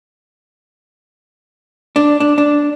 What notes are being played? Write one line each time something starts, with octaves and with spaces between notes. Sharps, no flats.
D4
D4
D4